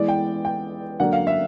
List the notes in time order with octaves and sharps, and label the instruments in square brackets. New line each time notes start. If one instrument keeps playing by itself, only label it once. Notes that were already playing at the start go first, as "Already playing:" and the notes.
Already playing: [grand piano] E3 G#3 B3 E4 D5
G5
G5
D3 F#3 A#3 D4 F#5
F5
E5